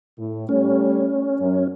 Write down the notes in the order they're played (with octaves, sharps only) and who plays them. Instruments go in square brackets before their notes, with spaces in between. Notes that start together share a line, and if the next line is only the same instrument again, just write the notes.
[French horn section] A2
[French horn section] G3 A3 [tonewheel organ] C#4
[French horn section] F#2